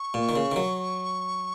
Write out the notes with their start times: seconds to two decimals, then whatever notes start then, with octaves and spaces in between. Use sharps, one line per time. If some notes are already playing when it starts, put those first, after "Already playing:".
Already playing: C#6
0.14 A#2
0.29 D#3
0.36 C#3
0.52 D#3
0.56 F#3